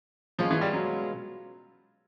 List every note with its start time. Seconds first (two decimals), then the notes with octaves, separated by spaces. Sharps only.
0.39 B2 F3 G#3 C#4 F4
0.51 E3
0.61 G3
0.73 F#3